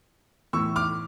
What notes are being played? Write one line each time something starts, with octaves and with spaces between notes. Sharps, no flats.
A2 E3 C#6 E6
D6 F6